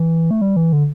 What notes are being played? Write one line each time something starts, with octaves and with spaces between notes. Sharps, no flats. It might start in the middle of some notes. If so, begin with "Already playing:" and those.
Already playing: E3
A3
G3
E3
D3